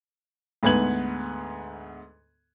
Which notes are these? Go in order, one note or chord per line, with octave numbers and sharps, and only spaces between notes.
D2 G#2 B3 B4 G#6 F#7